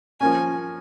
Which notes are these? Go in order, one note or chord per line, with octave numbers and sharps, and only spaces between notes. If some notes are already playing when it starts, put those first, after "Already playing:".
F3 A#3 C#4 G#5